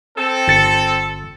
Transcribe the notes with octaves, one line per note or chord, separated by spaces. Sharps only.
C4 A4
G1 A6 C#7